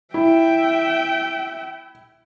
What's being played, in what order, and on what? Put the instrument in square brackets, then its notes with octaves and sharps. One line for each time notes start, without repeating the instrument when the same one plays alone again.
[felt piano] E4 [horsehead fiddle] E5 G5